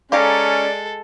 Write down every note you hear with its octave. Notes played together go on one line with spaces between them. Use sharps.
G#3 C#4 G4 A4 D5 F5 A#5